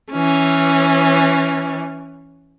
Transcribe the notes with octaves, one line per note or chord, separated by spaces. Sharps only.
E3 C#4